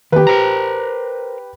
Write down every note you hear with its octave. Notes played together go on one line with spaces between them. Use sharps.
D#3 G4 B4
A#4 C5 A#5